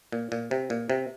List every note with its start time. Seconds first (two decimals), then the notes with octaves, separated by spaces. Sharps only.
0.12 A#2
0.32 A#2
0.51 C3
0.70 A#2
0.90 C3